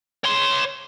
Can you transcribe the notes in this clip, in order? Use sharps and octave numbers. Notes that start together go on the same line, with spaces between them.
C#5 C6